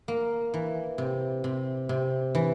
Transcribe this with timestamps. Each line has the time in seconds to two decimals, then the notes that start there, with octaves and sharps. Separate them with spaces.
0.08 A#3
0.54 E3
0.98 C3
1.44 C3
1.89 C3
2.35 E3